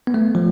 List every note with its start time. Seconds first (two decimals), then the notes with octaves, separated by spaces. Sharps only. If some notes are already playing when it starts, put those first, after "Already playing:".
0.07 B3
0.14 A3
0.35 F3